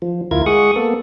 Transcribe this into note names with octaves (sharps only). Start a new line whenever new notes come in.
F3
D2 E4 F4 A#4 G#6
G#3 G#4 F#5 C#6 D#6
A#3 B3 A4